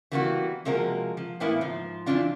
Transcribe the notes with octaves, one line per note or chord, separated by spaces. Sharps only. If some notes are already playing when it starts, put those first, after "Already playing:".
E3 G3 A#3 B3 D4 F#4
C3 F3 G#3 A#3 F#4 A#4
F3
A2 E3 A#3 B3 E4
G#2 F3
F2 B2 E3 D4 F4